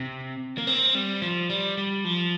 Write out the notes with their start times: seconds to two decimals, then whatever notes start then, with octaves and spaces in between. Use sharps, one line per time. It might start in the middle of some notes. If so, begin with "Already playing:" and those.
Already playing: C3
0.58 A#3
0.67 C4
0.95 G3
1.22 F3
1.50 G3
1.78 G3
2.05 F3